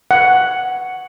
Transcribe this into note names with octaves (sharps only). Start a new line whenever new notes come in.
F#5